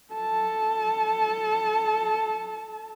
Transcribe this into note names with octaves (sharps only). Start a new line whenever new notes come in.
A4 A5